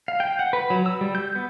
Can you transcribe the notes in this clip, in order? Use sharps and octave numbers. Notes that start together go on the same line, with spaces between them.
F5
G5
F#5
B4
F#3
E6
G3
G6
B3